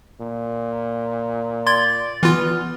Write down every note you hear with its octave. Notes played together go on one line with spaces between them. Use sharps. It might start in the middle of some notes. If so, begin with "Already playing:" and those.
A#2
D5 C6 G#6
E3 B3 F4 F6